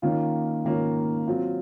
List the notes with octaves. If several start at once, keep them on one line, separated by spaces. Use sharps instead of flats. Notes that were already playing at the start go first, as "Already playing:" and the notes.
D#3 A#3 C#4 F4
D#3 A#3 C#4 F4
F#3 C4 F4